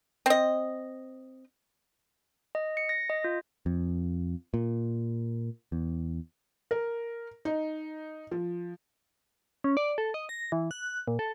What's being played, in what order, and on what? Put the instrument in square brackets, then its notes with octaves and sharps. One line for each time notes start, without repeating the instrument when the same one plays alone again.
[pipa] C4 D#5
[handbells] D#5
C#7
A#6
D#5
F4
[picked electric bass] F2
A#2
E2
[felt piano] A#4
D#4
F3
[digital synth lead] C#4
D5
A4
D#5
A#6
E3
F#6
A#2
A4